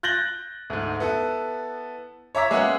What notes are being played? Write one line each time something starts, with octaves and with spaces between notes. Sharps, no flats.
F#6 G6 A6 A#6 F#7 G7
D2 G#2
B3 E4 A4
C#5 E5 A#5 D6 E6 B6
G#3 A#3 B3 C#4 E5 F#5